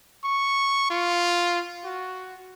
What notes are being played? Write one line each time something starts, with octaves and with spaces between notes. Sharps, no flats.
C#6
F4
F#4